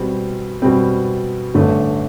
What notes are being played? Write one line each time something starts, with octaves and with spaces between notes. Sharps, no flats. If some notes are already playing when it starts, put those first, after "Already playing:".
Already playing: B2 G3 C4
B2 G3 C4
A1 G2 D3 A3